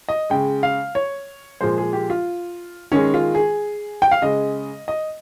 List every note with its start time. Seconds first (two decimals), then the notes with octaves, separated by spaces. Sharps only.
0.09 D#5
0.30 C#3 G#3 G5
0.63 F5
0.95 C#5
1.61 A#2 F3 G#3 C5
1.78 G#4
1.93 G4
2.10 F4
2.92 D#3 G#3 C#4
3.14 F4
3.35 G#4
4.02 G5
4.11 F5
4.22 C#3 G#3 D#5
4.88 D#5